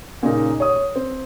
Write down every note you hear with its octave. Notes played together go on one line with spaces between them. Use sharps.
A#2 C#3 D#4 A#4
C#5 D#6
C4